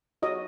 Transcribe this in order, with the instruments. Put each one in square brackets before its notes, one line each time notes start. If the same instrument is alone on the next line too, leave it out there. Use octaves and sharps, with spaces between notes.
[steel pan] F#4 C#5 D#5